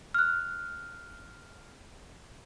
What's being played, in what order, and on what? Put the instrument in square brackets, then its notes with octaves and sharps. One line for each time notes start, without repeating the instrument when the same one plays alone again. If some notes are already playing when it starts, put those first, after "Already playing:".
[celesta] F6 F#6